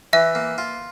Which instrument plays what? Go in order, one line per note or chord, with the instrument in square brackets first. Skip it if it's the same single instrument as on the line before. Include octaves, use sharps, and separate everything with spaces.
[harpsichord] E3 [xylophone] E5
[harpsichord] A#3
F4